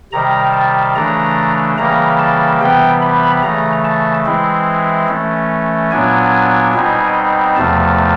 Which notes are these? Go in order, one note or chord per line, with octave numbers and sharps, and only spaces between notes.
C3 D#3 G3 A#5
A5
C#3 E3 A3 D4 A#5
C#3 E3 G3 A#3 A#5
A5
C3 E3 G3 B3 G5
B5
C#3 E3 A3 A#5
A5
E3 G#3 C4 E4
E3 A3 C#4
A#2 F#3 B3 D4 G#5
B2 G3 C4 D#4
E2 C3 F3 A3 A5